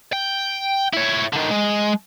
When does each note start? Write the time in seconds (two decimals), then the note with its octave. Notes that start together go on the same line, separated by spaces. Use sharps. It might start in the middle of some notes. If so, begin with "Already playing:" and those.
0.13 G5
0.93 E4 C#5
1.33 D3 D#3
1.51 G#3